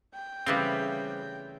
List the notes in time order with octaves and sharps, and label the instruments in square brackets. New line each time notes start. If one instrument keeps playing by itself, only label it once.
[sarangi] G5
[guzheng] C#3 E3 A3 [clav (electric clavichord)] G3 B3 C4